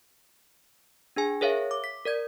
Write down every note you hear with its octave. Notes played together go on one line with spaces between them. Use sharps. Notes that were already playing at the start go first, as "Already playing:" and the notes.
D4 G#4 G#5
G#4 A#4 C#5 E5 F5
D6
B6
A#4 D5 G#6